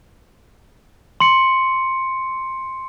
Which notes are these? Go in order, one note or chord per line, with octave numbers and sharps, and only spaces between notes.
C6 C#7